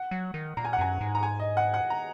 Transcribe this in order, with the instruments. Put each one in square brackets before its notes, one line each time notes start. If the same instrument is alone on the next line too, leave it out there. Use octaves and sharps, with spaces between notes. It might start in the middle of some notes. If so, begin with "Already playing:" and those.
Already playing: [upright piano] F#5
[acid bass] F#3
D#3
[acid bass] A#2 [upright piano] A#5
[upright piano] G#5
F#5
[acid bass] F#2 [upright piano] G#5
[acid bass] G#2
[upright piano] A#5
G#5
D#5
F#5
F#5
A#5